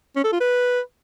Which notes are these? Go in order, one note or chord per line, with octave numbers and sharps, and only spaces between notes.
C#4
A4
F4
B4